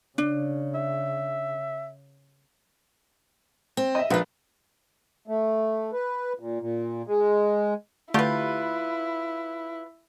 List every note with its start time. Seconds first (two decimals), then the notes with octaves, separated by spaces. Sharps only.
0.18 C#3 D4
0.75 E5
3.77 C4
3.95 D#5 E5
4.10 A#1 F4 F#4 B4
5.28 A3
5.93 B4
6.39 A#2
6.60 A#2
7.07 G#3
8.14 D3 A3 E4 F4 G4 B4